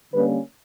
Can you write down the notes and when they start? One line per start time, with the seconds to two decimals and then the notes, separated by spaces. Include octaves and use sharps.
0.13 D3 G3 A#3 C#4 B4